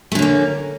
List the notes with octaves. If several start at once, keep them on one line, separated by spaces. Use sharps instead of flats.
D3 A3 A#3 C#4